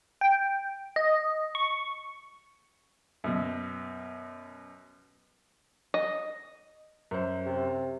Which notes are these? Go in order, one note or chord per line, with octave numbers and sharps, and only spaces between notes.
G5
D#5
C#6
F#2 B2
D#5
F#2 C5
C3